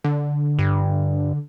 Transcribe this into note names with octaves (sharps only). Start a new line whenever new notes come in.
D3
G2